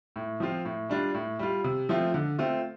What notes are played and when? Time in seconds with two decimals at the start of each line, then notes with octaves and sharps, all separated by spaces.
0.16 A2
0.40 F3 C4 F4
0.65 A2
0.89 G3 D4 F4
1.14 A2
1.39 G3 F4
1.64 C3
1.89 F3 A3 C4 F4
2.14 D3
2.39 A3 C4 F4